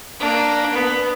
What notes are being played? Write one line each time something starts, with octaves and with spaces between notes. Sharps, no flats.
A#3 D4
B3